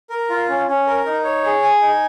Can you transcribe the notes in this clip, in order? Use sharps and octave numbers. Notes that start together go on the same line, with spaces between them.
A#4
F4
C#4
C#4
A#4
D#4
C#5
G#4
G#5
D#4